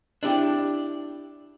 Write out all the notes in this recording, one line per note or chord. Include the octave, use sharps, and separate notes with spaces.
D4 E4 G4